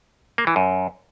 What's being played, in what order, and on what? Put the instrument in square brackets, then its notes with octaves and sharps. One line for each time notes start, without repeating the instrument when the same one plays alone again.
[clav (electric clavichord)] A#3
E3
F#2